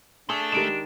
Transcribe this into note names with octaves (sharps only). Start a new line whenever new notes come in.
A3 D4 G#4
D#3 G#3 G4 D7 E7